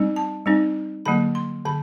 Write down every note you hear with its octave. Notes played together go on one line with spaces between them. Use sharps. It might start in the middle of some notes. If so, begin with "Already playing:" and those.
Already playing: G3 C4 D#4
A5
G3 C4 D#4
D3 F#3 A#3 B5
C6
D3 B5